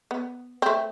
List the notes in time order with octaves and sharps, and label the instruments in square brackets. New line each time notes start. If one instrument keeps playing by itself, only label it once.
[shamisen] B3
A3 C4